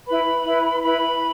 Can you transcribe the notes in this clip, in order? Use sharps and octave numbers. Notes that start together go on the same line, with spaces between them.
E4 B4 B5
E4 B4
E4 B4 B5